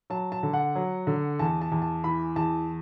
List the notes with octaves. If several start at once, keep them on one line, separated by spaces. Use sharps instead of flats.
F#3 A5
A5
D3
F#5
F#3
D3
E2 A5
A5
E2
A5
E3 B5
E2 A5